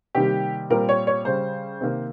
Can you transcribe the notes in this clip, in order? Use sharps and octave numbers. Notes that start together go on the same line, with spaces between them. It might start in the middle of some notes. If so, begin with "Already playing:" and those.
C3 D#3 G3 A#3 G4
A#2 G3 C4 A#4
C#5
C#5
C#3 G3 C#4 C5
C3 D#3 A#3